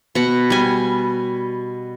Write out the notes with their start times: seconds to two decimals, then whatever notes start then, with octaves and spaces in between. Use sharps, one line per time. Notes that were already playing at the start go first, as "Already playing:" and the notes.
0.15 B2 F#5
0.50 G3 G#5